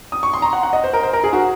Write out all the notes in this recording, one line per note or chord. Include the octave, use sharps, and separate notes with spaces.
D#6
C#6
C6
A#5
F#5
F#5
D#5
C5
A#4
C5
A#4
G#4
F#4